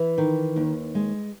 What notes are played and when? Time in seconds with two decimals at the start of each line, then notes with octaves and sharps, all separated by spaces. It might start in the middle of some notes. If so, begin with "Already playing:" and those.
Already playing: E3
0.18 D#3
0.56 D#2
0.95 G#3